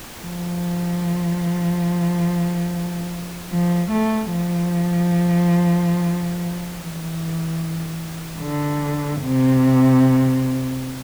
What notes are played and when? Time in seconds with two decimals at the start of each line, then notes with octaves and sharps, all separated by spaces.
0.24 F3
3.50 F3
3.91 A3
4.32 F3
6.77 E3
8.40 D3
9.22 C3